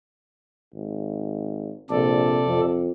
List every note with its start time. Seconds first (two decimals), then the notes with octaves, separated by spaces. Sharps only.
0.74 G#1
1.90 A#1 C3 A4 D5
2.47 F2